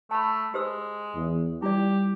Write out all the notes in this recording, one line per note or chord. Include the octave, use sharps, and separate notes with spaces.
A3 A5 B5
G#3 G4 C5 E6
E2
G3 E4 F4 G4 D5